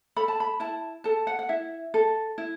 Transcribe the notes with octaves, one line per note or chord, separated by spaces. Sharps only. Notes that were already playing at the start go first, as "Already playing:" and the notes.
A4 B5
A5
B5
E4 A5
A4 A5
F#5
F#5
E4 E5
A4
E4